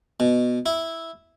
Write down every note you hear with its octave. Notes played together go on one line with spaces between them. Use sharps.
B2
E4